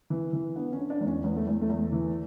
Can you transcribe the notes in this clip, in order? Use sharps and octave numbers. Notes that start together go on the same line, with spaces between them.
E3
E3
D3 B3
C#4
D3
D4
E2
C#4
E2 B3
A3
E2
A3
E2
E3